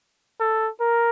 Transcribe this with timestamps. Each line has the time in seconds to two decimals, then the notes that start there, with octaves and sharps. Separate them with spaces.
0.40 A4
0.81 A#4